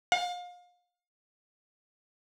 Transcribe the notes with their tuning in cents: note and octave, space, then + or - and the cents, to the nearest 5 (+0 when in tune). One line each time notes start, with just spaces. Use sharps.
F5 +30